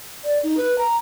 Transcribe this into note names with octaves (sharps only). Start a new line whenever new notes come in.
D5
D#4
B4
A#5